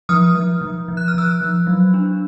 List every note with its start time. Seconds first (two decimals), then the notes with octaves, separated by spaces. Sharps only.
0.09 F3 D#6 F6
0.35 F3
0.61 F3
0.88 F3
0.97 F#6
1.08 F6
1.14 F3 E6 F#6
1.41 F3
1.67 F#3
1.94 D4